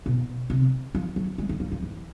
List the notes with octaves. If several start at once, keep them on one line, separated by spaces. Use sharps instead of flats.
B2
C3
F3
F#3
G#3
D#3
F3
F3
E3